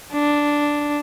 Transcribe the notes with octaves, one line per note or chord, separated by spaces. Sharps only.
D4